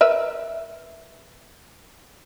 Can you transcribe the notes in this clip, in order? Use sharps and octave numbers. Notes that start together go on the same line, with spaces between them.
A#4 B4 E5